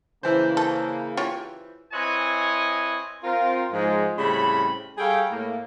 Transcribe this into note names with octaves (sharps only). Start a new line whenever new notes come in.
C#3 E3 A#3 C5
A4
F4 G4 C#5
C4 E4 B4 C#5 D#5 G#5
C4 F4 A#4
G#2 F3 G#3
A2 C#3 G3 C4 B5
G3 G#4 A4 C#5 F5 G5
A2 A#3